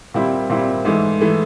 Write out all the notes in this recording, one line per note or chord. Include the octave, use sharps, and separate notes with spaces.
A#2 G3 C4 E4
A#2 G3 C4 E4
G#2 E3 A3
E3 A3